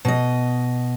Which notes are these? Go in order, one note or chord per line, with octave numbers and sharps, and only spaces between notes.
B2 D#5